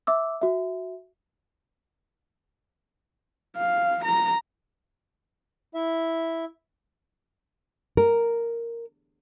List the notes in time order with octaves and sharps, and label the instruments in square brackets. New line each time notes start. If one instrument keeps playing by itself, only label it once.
[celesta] E5 D6 E6
F#4 E5
[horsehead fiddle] F5
A#5
[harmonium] E4 E5
[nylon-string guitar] A#4